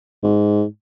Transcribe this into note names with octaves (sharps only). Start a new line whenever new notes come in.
G#2